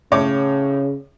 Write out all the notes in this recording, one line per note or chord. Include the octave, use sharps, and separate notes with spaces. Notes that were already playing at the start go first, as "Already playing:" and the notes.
A2 C#3 C#5 D6